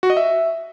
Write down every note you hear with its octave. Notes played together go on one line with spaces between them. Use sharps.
F#4
D#5
E5